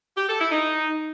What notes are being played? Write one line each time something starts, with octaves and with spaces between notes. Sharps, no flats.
G4
A4
E4
D#4